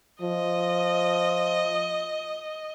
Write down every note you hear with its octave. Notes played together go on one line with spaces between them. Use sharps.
F3 D#5